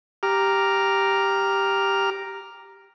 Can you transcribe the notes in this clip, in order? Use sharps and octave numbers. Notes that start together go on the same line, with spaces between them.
G4 A#5 D6 F6